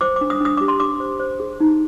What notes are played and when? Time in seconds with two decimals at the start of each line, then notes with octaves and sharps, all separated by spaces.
0.01 C5 D6
0.16 D4 D6
0.30 D#6
0.41 D4 D#6
0.57 G4 D6
0.68 C6
0.80 D4 D6
1.00 C5
1.20 C5
1.40 G#4
1.60 D#4